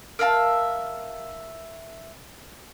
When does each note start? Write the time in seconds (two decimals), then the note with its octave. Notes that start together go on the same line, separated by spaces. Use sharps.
0.19 A#4 E5 F5 A5